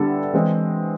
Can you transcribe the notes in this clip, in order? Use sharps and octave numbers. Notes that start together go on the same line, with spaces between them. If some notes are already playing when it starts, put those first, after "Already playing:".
Already playing: D3 G3 B3 E4 A4
E3 G#3 C4